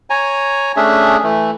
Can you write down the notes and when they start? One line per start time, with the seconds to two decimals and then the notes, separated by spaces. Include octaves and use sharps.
0.10 C#5 G#5 A#5
0.76 A3 C#4 D4 G#4 E5
1.23 E3 A3